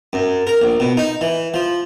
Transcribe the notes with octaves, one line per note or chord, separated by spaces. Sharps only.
F#2
A#4
A#1
B2
D#4
E3
F3